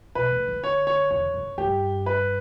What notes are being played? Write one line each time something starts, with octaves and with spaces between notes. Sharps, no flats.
B2 B4
A2
D3
C#5
C#5
E2 C#5
F#2
G2 G4
B4